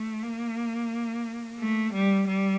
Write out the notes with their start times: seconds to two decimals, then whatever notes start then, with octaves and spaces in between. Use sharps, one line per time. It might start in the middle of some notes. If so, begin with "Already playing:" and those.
Already playing: A3
0.22 A#3
1.59 A3
1.93 G3
2.27 G3